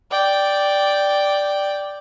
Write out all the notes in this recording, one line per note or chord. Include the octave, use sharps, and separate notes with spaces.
D5 G5